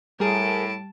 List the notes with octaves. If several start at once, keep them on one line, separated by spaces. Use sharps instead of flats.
A2 G3 G#4 A#4 A5 D7